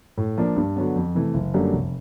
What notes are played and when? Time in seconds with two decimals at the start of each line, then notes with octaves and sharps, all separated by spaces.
0.18 A2
0.37 F3 A#3 D4
0.56 G2
0.76 D3 F#3 B3
0.96 F2
1.15 C3 E3 A3
1.34 F#1
1.54 F#2 D3 G3 A#3
1.73 F1